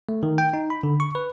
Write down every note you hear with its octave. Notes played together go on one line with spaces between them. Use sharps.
A3
D#3
G5
D#4
B5
D3
C#6
B4